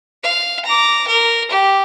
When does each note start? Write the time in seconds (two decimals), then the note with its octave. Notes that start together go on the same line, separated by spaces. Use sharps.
0.23 F5
0.65 A#5 D6
1.07 A#4
1.50 G4